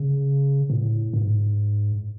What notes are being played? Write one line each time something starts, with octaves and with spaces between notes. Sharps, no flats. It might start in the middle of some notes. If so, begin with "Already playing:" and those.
Already playing: C#3
A2
G#2